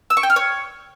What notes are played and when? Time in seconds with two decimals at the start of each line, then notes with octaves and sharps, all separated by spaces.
0.10 E6
0.17 C#6
0.23 G5
0.30 F6
0.36 C#5